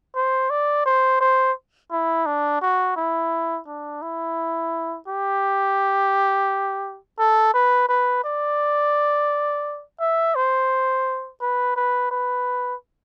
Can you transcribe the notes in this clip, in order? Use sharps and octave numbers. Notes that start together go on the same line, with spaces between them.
C5
D5
C5
C5
E4
D4
F#4
E4
D4
E4
G4
A4
B4
B4
D5
E5
C5
B4
B4
B4